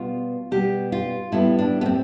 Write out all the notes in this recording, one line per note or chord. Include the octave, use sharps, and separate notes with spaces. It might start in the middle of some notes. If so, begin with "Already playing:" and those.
Already playing: B2 G3 B3 F4
B2 G3 B3 G4
F4
A2 G3 B3 E4
D4
B3
C4